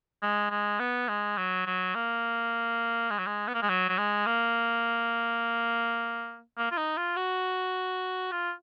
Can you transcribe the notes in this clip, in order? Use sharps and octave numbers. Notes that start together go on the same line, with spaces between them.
G#3
G#3
B3
G#3
F#3
F#3
A#3
G#3
F#3
G#3
B3
A#3
G#3
F#3
F#3
G#3
A#3
A#3
F4
D#4
F4
F#4
F4